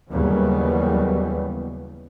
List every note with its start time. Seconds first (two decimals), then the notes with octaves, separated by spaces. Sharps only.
0.10 D#2 C#3 E3 F#3 G3 B3